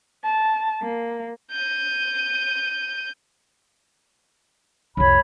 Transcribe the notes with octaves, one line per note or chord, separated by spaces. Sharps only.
A5
A#3
G6 D#7
C2 F2 C#5 B5